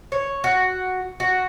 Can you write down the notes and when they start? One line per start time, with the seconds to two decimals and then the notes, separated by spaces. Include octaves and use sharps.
0.12 C#5
0.44 F#4
1.20 F#4